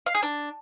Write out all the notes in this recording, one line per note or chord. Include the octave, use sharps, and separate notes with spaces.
F5
G#4
D4